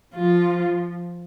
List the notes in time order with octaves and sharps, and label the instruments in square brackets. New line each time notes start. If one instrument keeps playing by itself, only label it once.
[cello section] F3 [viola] F4